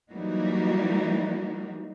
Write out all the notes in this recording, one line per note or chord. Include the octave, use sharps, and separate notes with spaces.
E3 F#3 G3 A#3 D#4 F#4